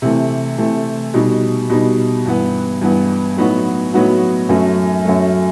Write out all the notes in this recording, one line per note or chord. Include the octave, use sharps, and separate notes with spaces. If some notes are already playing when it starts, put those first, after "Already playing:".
C3 E3 A3
C3 E3 A3
B2 G3 D#4
B2 G3 D#4
G2 E3 B3
G2 E3 B3
A2 F#3 B3 D#4 F#4
A2 F#3 B3 D#4 F#4
F#2 F#3 A3
F#2 F#3 A3